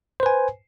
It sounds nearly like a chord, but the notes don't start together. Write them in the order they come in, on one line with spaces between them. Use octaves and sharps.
C5 B4 G#5